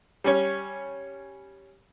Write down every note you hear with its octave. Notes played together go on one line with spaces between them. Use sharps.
G3 C#4 C#5